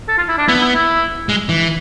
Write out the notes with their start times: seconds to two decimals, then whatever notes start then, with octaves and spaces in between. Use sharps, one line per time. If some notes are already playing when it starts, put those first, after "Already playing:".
0.08 A4
0.18 F4
0.29 E4
0.38 D4
0.48 B3 E4
0.61 E4
0.75 E4
1.29 G#3
1.49 E3